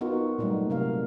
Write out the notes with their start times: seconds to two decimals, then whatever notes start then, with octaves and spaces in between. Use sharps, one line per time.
0.01 B3 D#4 F4 F#4 A#4
0.38 A#2 F#3 G3 A3 D#4
0.70 C3 A#4 F5